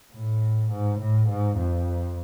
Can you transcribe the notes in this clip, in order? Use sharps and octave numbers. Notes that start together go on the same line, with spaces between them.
A2
G#2
A2
G#2
F2